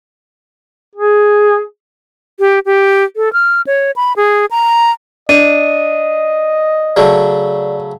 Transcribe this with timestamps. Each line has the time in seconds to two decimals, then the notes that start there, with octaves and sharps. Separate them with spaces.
0.95 G#4
2.39 G4
2.66 G4
3.16 A4
3.33 F6
3.67 C#5
3.96 B5
4.17 G#4
4.51 A#5
5.29 D4 D#5 D#7
6.96 C#3 F#3 A3 D5